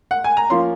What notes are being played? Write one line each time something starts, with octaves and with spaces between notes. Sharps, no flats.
F#5
G#5
A#5
F3 A#3 C#4 C6